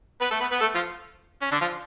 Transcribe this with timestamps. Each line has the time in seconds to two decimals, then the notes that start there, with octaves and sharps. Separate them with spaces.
0.21 B3 B4
0.31 A3 A4
0.40 B3 B4
0.51 B3 B4
0.61 A3 A4
0.75 F3 F4
1.42 C#4
1.51 D3 D4
1.61 F3 F4